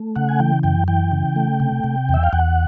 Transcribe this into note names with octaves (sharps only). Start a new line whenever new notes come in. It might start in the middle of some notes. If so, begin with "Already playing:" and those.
Already playing: A3
C#3 F#5
G#5
E3 G5
F#2 G5
E3 G5
C#3
A3
C3
C3
E2
E5
F5
E2 F#5